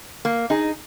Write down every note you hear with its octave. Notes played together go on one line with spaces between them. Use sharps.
A#3
D#4 G#4